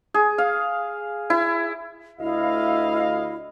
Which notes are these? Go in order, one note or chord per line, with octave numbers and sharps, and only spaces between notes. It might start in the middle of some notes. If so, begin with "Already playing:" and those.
G#4
F5
E4
D2 E4 D#5 F5